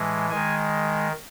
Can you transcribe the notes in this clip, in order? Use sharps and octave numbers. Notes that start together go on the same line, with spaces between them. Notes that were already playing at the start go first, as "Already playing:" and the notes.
Already playing: A2 E3 G#3
D#3 G#3 G#5